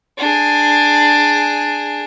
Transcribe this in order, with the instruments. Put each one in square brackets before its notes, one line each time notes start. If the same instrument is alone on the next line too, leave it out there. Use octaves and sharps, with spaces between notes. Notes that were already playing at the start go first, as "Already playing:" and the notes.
[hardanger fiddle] D4 G#4